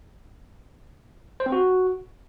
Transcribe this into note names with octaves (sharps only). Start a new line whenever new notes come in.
C5
C4
F#4